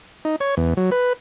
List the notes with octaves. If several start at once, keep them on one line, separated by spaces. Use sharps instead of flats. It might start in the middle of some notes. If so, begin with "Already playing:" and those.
D#4
C#5
E2
F#3
B4